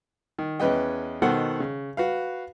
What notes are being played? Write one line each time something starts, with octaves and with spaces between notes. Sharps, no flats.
D#3
E2 C#4 B4 D#5 G5
B2 D#3 A4 C5 F#5
C#3
F#4 B4 F5